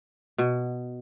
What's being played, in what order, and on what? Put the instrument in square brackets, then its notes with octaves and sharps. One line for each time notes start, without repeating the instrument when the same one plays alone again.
[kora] B2